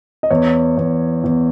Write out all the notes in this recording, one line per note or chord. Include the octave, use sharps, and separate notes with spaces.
D#5
E2 C#5
E2
E2